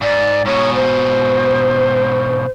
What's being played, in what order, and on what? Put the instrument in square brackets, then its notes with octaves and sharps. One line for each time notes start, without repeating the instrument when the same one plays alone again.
[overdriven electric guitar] G#2 [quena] D5
[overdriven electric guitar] G#2 B2 [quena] C#5
[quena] C5